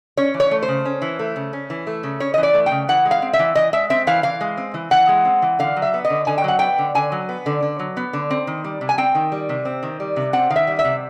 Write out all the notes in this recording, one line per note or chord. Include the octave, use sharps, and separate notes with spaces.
C#4 C#5
E3
C#5
A3
C5
C#3
C#4
E3
A3
C#3
C#4
E3
A3
C#3
C#4 C#5
D#5
E3
D5
A3
C#3 G5
E3 F#5
G#3
F5
C4
E5
E3
E3 D#5
G#3 E5
C4 E5
E3 F5
E3 F5
G#3
C4
E3
E3 F#5
G#3
C4
E3
D3 F5
F#3
E5
B3
D#5
D3
D3 G#5
G5
F#3 F#5
B3 G5
D3
D3 G#5
F#3
B3
D3
D3
F#3
B3
D3
C4
D#3
G3
C3
G#5
C4 G5
D#3
G3
C3
C4
D#3
G3
C3
C4 F#5
D#3 F5
E5
G3
E5
C3